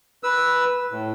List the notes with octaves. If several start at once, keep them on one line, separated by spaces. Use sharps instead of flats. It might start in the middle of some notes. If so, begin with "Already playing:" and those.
B4 E6
A2